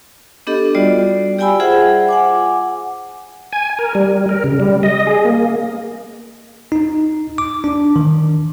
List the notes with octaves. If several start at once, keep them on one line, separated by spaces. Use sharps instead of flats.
B3 D4 G4 A4 D#5
G3 F4 F#4 D5
G4 D5 G5 G#5 B5 E6
F4 G#4 C5 E5 F#5
F#5 G#5 D6
G#5
A#4
G3
A#4
C#3
G3
D#5
G#4
A#3
D#4
D6
D4
D#3